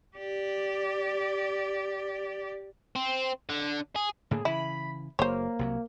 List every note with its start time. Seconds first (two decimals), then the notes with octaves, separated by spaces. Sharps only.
0.17 G4 D5
2.96 C4
3.49 D3
3.96 G#4
4.31 A2 D3 A#3 G#4
4.45 C#3 E3 E4 B5
5.19 F#1 A#3 C5 C#5
5.59 C2 C3 F#3